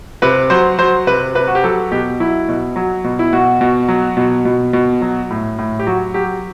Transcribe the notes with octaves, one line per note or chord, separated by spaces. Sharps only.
C3 B4
F#3 C5
F#3 C5
C3 B4
C3 B4
F#4
G4
F#3 A4
B2 G4
F#3 E4
B2
F#3
B2
E4
B2 F#4
B2
F#3
B2
B2
B2
F#3
A2
A2
G4
F#3 F#4
F#3 G4